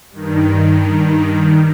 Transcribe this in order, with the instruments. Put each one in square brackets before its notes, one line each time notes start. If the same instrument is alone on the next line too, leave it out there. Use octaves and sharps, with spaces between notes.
[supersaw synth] G2 D#3